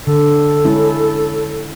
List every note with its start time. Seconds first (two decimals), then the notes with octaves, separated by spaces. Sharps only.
0.07 D3 A4
0.65 G#3 C#4 E4